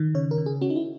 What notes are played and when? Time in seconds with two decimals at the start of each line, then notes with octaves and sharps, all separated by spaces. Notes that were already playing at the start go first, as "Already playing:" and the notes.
Already playing: D#3
0.15 C#3 C#5
0.31 A#4
0.38 C#3
0.46 G#4
0.61 C#4 F#4
0.70 D#4
0.76 E4